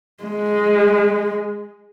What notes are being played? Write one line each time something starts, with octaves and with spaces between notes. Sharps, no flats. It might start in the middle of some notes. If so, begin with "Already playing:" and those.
G#3